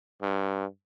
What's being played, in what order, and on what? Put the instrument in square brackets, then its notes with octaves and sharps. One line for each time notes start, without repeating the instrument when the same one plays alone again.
[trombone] G2